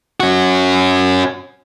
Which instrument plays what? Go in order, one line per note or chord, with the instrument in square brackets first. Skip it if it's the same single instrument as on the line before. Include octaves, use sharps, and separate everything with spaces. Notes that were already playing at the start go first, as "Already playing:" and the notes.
[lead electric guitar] C#4 F#4